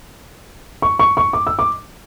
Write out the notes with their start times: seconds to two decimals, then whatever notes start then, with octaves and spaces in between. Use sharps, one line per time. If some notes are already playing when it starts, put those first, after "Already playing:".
0.82 C#6
0.99 C#6
1.17 C#6
1.33 D6
1.47 E6
1.59 D6